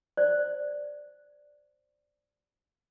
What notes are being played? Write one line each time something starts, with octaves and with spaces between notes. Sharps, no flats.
C5 D5